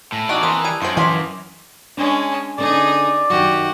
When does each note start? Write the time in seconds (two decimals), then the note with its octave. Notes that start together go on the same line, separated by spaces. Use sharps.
0.12 A2 G#5 B5
0.29 E2 D#4 F#4 G4 D5 A5 E6 F#6
0.43 E3 C4 A#4 D#6
0.64 G3 B5 G#6 D#7
0.82 F#2 F4 C5 C#6 D7 F#7
0.97 E3 C5 F5 G#5 D6 B6 E7
1.97 G#3 C#4 D4
2.58 D3 C#4 D#4 G#4 D5
3.30 F#2 D#3 F#3 F#4 G4